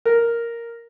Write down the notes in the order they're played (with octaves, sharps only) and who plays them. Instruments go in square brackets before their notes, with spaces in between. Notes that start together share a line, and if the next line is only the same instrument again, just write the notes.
[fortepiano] A#4